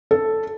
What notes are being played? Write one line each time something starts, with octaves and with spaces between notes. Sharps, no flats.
A4